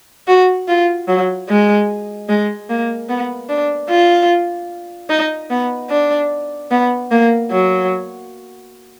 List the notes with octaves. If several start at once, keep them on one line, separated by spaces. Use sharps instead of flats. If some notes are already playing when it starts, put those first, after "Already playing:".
F#4
F4
F#3
G#3
G#3
A#3
B3
D4
F4
D#4
B3
D4
B3
A#3
F#3